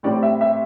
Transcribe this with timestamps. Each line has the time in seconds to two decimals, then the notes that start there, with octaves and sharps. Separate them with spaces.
0.03 A2 G3 C4 D5
0.23 E5
0.41 E5